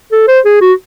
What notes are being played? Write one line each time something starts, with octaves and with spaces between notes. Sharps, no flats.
A4
C5
G#4
F#4